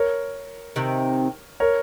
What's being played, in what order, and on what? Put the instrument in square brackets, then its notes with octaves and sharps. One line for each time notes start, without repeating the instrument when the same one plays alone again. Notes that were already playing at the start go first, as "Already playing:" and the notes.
Already playing: [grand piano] A#4 C#5
[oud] C3 D#3
[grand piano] A#4 C#5